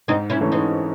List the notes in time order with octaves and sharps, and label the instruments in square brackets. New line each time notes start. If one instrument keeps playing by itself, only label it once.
[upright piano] G#2 [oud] C4 D#4
[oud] C#4 E4
[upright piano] E3 A3 C#4
[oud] C4 D#4